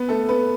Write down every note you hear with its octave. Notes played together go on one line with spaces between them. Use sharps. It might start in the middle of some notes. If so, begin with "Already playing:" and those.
Already playing: B3 B4
A3 A4
B3 B4